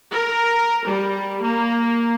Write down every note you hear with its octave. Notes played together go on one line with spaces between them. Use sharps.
A#4
G3
A#3